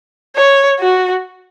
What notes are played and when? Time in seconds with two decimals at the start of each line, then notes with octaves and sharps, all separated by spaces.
0.36 C#5
0.80 F#4